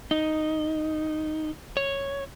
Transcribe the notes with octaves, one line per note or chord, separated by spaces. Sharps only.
D#4
C#5